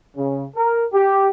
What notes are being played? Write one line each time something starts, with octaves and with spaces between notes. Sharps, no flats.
C#3
A#4
G4